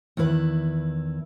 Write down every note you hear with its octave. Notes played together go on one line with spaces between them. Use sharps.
E2 D#3 E4 B4